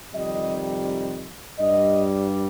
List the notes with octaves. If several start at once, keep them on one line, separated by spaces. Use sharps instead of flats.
F2 C3 D#3 G3 D#5
G2 G3 D#5